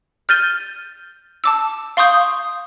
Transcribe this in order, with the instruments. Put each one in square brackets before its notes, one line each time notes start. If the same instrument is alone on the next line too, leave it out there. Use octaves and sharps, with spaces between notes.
[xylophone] F6 G6 A6 D#7 G7
A5 D6 E6
F5 C6 C#6 D#6 G6